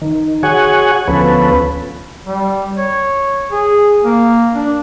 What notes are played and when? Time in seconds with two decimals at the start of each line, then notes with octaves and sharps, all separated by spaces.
0.02 D#3
0.43 F#4 G#4 C#5 F#5 G#5
1.08 D2 F3 B3 C#4 A4 B4
2.26 G3
2.78 C#5
3.52 G#4
4.04 A#3
4.55 D4